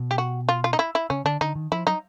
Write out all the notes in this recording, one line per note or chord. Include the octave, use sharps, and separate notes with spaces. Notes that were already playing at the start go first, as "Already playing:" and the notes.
Already playing: B2
G4
F#4
F4
F4
D#4
E4
E4
C#3 C#4
D3 D4
D3 D#4
D#3
F3 E4
F#3 D#4